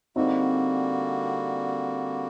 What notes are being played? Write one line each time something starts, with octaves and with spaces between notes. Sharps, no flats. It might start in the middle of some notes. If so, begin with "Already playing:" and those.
D3 G3 A#3 C4 D#4 F#4